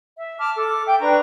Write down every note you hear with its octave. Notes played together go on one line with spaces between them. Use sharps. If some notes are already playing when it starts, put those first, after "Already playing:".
E5
A5 D6 F6
A4 D6
E5 G5
D4 B4 A#5 C#6